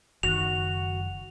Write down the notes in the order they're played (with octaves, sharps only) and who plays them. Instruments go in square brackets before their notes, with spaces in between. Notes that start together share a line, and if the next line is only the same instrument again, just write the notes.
[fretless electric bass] F#1 D#3 [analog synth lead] F#4 [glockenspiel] F7